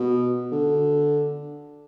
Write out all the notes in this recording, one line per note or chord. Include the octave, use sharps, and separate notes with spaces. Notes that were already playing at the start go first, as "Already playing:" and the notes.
Already playing: B2
D3